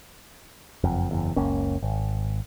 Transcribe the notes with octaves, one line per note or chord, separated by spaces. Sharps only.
F#1 F2
F#1 E2
F#1 C#2 A#3 C#4
G#1